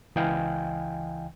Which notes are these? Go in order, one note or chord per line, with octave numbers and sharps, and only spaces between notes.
C#2 E3 D#5 F5 G5 G#5